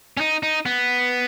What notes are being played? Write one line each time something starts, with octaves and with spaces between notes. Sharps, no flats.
C#4
D#4
D#4
B3